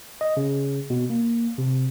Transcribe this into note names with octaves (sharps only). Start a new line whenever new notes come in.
D#5
C#3
B2
A#3
C3